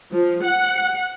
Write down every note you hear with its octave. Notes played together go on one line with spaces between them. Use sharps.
F3
F#5